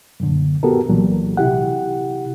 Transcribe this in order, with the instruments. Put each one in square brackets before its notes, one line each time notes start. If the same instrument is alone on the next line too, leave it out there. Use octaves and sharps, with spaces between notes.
[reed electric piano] F#2 A#2 D3
B3 F#4 G4 A4 A#4
C2 A#2 E3 F#3
C3 E4 G4 F#5